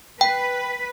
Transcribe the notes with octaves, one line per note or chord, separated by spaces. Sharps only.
B4 G5